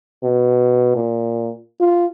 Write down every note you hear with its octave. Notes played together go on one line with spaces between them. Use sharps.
B2
A#2
F4